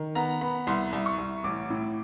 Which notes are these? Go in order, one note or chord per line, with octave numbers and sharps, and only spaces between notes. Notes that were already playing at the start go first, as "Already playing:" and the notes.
Already playing: D#3
B3 A#5
B3 B5
C2 C6
C2
C#6
C2
A1 D6
A2